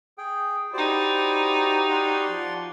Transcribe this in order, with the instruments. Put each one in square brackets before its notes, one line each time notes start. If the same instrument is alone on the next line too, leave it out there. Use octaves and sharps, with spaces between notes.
[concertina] G#4 G5
[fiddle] D#4 E4 [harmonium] F#4 G4 [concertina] C5 D5
[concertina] D5 F#5 C6
[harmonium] F3